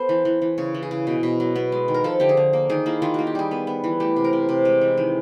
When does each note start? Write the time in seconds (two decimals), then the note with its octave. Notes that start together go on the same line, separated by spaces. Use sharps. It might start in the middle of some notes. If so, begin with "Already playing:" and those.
Already playing: B3 A4 C5
0.09 E3
0.25 E3
0.42 E3
0.58 C#3 C#5
0.74 E3
0.83 G#4
0.91 C#3
1.07 B2
1.23 B2
1.40 F#3
1.56 B3
1.72 G#3
1.88 D#3
1.94 A#4
2.04 F3 A4
2.20 D3 G4
2.29 G#4
2.37 D3
2.53 A#3
2.70 D#3 G#4
2.86 A#3 E4
3.02 D#3 F4
3.14 A#3 F#4
3.27 G4
3.35 G3 G#4
3.51 B3
3.67 B3
3.84 E3
4.00 A3 G4
4.16 C3
4.24 A#4
4.33 C3
4.49 C3
4.65 G#3
4.81 E3
4.97 D#3